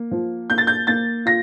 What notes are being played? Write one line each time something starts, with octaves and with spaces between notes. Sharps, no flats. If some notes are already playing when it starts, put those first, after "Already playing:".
Already playing: A#3
F3
A#3 G6
A6
G6
A#3 A6
F4 A#6